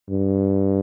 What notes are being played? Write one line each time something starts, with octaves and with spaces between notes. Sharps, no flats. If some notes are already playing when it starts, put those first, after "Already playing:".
G2